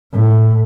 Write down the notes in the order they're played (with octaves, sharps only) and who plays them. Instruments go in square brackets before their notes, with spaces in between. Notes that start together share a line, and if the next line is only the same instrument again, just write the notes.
[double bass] A2